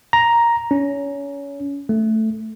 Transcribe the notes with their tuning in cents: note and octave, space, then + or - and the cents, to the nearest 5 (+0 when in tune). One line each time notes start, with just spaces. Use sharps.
A#5 +5
C#4 +25
A3 +0